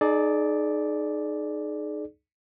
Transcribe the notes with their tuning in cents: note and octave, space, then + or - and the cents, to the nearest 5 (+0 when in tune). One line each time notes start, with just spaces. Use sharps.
D#4 -20 G#4 +35 D5 +0